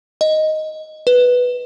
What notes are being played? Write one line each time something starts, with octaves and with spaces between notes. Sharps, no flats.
D#5
B4